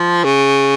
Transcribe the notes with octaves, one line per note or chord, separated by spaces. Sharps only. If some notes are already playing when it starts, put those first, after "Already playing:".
Already playing: F3
C#3